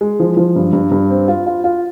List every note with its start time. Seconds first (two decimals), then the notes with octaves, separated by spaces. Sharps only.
0.01 G#3
0.20 F3
0.37 F3
0.56 G2
0.73 G2
0.91 G2
1.10 C4
1.28 F4
1.47 F4
1.64 F4